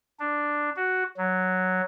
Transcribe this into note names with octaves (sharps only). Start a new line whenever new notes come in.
D4
F#4
F#3